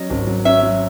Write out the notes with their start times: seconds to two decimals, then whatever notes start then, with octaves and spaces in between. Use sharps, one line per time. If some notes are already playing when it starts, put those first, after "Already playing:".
Already playing: F#3 C#4 D#5
0.10 G#1
0.27 F#3
0.45 C#4 E5
0.63 F#3